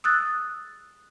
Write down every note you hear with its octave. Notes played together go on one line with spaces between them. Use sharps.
D#6 E6 F#6 A6